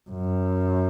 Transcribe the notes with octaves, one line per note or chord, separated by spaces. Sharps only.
F#2